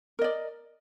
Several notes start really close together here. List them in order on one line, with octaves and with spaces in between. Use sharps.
A#4 D#5 D5